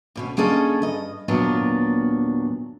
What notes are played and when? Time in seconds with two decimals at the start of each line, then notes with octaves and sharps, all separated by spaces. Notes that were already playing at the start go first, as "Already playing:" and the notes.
0.16 D2 B2 C#4
0.37 D3 A#3 C#4 G#4 A4 D#5
0.82 G2 D#5
1.28 D#2 A#2 F#3 B3 D4